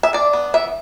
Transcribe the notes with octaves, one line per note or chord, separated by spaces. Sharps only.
E5
D4 D5
B3
E3 E5